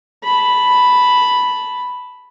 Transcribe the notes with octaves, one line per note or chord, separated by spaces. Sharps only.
A5 B5